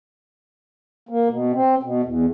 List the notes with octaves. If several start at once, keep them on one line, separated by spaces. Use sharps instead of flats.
A#3
B2
C4
B2
E2